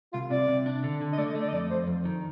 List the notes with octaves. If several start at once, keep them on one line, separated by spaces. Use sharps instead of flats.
C2 F4
C3 D5
C3
D4
D3
D3
D#5
A3 D5
D#5
A3
D5
D#5
F2 D5
F2 C5
F2
D#3